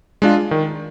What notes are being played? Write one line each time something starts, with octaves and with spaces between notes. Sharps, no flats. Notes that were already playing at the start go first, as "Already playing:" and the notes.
G#3 D4 F4
D#3